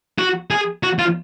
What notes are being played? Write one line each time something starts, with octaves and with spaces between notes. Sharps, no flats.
F#4
G#4
F#4
F4